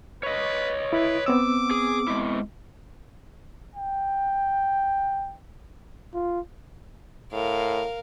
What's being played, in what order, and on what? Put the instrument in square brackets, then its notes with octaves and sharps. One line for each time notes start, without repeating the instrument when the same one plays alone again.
[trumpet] B4 [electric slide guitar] C#5 D#5
[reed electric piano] E4 [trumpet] B4
[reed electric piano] B3 C4 E6 [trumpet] D6
[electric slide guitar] G#4
G#3 E4
[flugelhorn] G5
F4
[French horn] A2 [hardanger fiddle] A#4 F5